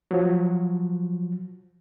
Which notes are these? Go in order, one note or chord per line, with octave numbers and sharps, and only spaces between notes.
F3 F#3